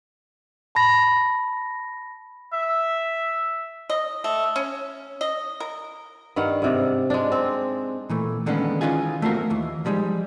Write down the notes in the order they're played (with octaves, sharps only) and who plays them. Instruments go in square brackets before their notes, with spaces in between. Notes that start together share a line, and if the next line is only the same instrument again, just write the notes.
[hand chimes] A5 B5 A#6
[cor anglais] E5
[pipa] D#5
A3
C#4
D#5
A#4
[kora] G2 D#3 F5 F#5
G#2 C3 D5
G#3 D4
C4
[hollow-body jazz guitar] A#2 E3 A3
D3 D#3 G#3 A#3 B3 C#4
D#3 E3 C#4 D#4 F4 G#4
A3 A#3 C4 F4 F#4 A#4
D#2 E3
F3 G3 G#3 C4 D#4